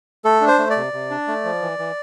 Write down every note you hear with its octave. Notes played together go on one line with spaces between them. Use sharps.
A3 A4
D4
C5
A3
D5
C3
C3
D4
A3
F3
E3
E3